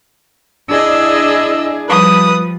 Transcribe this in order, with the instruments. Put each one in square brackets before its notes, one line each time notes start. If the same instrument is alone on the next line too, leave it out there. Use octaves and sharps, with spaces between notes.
[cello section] D4 E4 G#4 [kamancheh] D#5 E6
[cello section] F3 G3 [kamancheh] B4 D#6